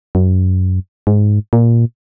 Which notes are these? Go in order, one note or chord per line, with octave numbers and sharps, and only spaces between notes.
F#2
G#2
A#2